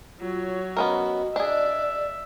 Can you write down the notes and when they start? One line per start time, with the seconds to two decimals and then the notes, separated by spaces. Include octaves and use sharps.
0.20 F#3 F4 C#5
0.77 B3 C#4 F#4 A#4 D#5
1.36 D4 G#4 D5 E5